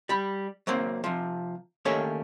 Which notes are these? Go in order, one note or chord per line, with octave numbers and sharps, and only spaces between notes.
G3 B5
F#3 A#3 C4
C3 F3
D#3 A3 A#3 C#4 G4 C#5